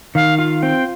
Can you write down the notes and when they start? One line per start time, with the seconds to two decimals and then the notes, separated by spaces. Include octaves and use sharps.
0.15 D#3 F5
0.39 F4 F5
0.62 C4 G5